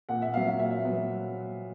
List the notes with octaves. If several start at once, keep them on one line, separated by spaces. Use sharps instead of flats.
A#2 F#5
E5
F#3 B3 F5
F5
A#2 E5
F#3 B3